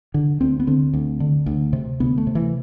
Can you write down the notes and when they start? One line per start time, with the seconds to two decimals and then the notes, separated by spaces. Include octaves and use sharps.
0.14 D3
0.41 D2 C4
0.60 B3
0.67 D3 C4
0.93 D2
1.20 D3
1.46 D2
1.73 C3
2.00 D2 B3
2.18 A3
2.27 C3
2.35 E3